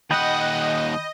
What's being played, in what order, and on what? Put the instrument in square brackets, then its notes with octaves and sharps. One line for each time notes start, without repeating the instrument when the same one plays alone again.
[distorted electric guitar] D#2 F#5 [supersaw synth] D#5 [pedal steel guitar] G5 B5 D#6